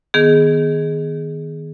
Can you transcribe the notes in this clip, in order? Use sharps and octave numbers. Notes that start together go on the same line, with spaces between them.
D#3 B3 G#4